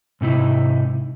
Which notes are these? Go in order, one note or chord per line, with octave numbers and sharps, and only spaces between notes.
G#2 C3 D#4 E4